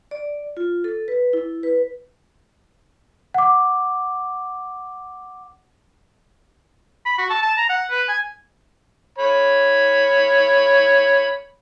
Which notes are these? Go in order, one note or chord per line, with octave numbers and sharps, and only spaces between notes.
D5
F4
A4
B4
E4
B4
F#5 D6
B5
F#4
A5
A5
A#5
F#5
B4
G#5
C#5 B5